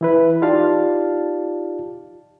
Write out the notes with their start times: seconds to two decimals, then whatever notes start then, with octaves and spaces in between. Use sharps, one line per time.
0.01 E3 E4 B4
0.42 D#4 F4 G4 D5 F5 A5